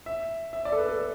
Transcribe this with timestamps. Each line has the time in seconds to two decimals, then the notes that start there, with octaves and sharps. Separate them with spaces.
0.06 E5
0.53 E5
0.65 D5
0.72 A4
0.77 B4
0.88 A4